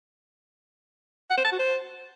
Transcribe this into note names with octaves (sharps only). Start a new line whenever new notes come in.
F#5
C5
A5
F#4
C5